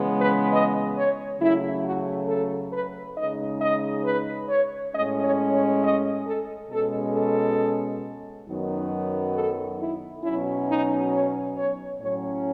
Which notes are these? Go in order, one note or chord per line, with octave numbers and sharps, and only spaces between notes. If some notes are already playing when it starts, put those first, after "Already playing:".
Already playing: C#3 E3 G#3 B3
B4
D#5
C#5
C#3 F#3 A3 E4
F#4
A4
B4
C#3 G#3 D#4 D#5
D#5
B4
C#5
A2 G#3 C#4 D#5
C#5
C#5
D#5
A4
B2 G#3 C#4 A4
A4
F#2 D#3 F#3 B3 D#4
A4
E4
B2 F#3 C#4 E4
D#4
C#5
C#5
A2 F#3 C#4 C#5